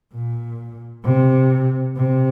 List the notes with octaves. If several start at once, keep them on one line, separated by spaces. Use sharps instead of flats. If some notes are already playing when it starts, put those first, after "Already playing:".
A#2
C3
C3